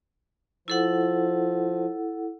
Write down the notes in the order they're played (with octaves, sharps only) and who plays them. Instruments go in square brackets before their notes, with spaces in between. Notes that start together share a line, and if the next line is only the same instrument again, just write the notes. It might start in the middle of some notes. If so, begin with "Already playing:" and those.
[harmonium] F3 [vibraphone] E4 A4 F#5